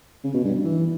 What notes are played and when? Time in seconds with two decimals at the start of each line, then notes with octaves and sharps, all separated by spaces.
0.24 C#3
0.34 B2
0.44 G2
0.54 G2
0.64 E3